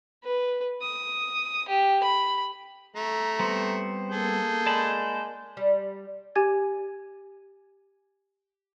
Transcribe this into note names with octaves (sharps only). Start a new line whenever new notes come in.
B4
D#6
G4
B5
A3 A#5
G3 B3 C4 C5
A#3 G#4 A4 G6
G#3 D5 A5 B5
G3
G4 G#5 G#6 A6